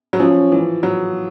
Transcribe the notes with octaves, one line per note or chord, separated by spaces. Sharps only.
F#3
F3 C#4
E3
F#3